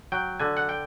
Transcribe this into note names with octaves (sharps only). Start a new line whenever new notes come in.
F#3 G5
D3 G#5
F#5
G5